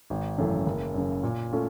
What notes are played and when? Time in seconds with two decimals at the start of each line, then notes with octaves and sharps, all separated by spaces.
0.10 G#1
0.38 F#2 C#3 E3 A3
0.66 F#1
0.94 F#2 C#3
1.23 A#2
1.51 A3 C#4 F4